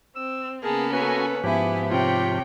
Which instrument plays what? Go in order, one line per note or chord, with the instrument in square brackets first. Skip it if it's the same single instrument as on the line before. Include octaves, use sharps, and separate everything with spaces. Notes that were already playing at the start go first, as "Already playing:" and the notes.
[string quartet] C4 [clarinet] E6
[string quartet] C#3 A#3 B3 [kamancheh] G#4 A5 [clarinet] A#4
[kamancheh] C#4 A4 [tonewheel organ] F#4 G#5 [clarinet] B4
[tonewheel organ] G#2 F3 G4 [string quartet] B3 E4 [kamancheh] G#5
[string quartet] C3 [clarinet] F4 [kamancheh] C#5 G5